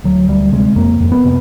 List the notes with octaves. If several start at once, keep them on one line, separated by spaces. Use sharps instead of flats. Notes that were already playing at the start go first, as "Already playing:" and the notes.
D2 F#3
D2 G3
C3 G#3
F2 A#3
F2
B3
C3